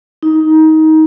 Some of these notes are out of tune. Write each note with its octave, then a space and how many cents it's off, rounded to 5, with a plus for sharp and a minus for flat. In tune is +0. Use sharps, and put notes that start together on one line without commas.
D#4 +20